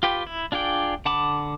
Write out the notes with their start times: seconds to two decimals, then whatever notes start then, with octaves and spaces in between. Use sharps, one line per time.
0.03 F4 G4 B4 G5
0.27 E4
0.52 D4 F4 G#4 D5 G5
1.05 D3 F#5 A5 B5 D6